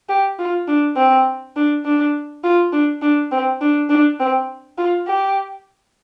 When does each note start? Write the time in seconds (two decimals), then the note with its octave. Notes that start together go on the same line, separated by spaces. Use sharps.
0.09 G4
0.39 F4
0.68 D4
0.97 C4
1.56 D4
1.85 D4
2.44 F4
2.73 D4
3.02 D4
3.32 C4
3.61 D4
3.89 D4
4.20 C4
4.78 F4
5.07 G4